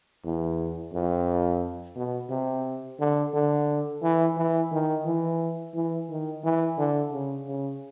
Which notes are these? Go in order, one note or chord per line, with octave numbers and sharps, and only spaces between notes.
E2
F2
B2
C3
D3
D3
E3
E3
D#3
E3
E3
D#3
E3
D3
C#3
C#3